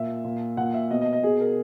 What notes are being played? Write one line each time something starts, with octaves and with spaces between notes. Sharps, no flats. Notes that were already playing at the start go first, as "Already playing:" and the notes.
Already playing: A#2 E5
A#2
A#2 F#5
E5
B2 D#5
D#5
D#5
B2 G#4
A#4